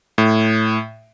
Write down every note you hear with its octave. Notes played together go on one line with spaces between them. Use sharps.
A2